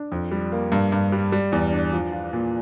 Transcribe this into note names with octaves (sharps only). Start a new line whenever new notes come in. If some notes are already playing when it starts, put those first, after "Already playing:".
Already playing: D4
F2
G3
A#3
G2
G2
G3
G3
E2
D4
F3
F4
A#2